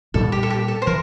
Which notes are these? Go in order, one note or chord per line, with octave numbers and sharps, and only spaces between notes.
A#2 G3 D4 A4
G4
A4
G4
A4
C5
E3 A#4